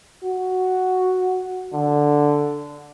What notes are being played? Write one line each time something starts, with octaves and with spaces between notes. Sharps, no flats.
F#4
D3